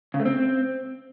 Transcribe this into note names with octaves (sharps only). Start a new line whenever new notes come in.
C#3
A3
C4